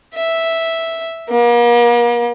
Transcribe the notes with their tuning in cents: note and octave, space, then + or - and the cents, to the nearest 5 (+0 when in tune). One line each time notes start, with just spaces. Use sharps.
E5 -5
A#3 +40